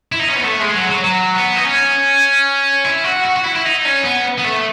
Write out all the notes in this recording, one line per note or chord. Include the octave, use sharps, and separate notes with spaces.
E4
D#4
C#4
B3
A3
G#3
F#3
F#3
F#3
B3
D#4
C#4
E4
F#4
F#4
F#4
E4
E4
D#4
C#4
B3
B3
A3